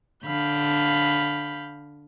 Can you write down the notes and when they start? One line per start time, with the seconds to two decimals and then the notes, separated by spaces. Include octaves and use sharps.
0.25 D3 F5 B5 G6